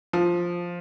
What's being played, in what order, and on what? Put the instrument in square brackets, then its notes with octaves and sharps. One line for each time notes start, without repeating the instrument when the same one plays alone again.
[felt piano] F3